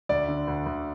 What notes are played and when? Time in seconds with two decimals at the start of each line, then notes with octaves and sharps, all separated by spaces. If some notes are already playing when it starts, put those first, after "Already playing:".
0.09 D2 D5
0.28 D3
0.47 D2
0.66 D2